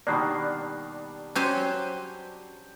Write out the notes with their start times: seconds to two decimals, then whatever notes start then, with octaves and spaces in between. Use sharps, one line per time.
0.07 B2 D#3 G3 A#3 D4 D5 F#6 C7
1.36 F#3 C#4 G4 C5 G5